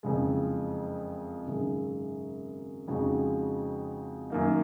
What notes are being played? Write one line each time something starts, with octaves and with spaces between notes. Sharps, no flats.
F#1 F2 C#3 G#3
G#1 F#2 C#3 G#3 D#4
F2 C#3 G#3 D#4 F#4
F#2 D#3 A#3 D#4